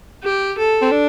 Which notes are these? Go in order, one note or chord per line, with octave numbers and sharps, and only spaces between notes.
G4
A4
C4
D4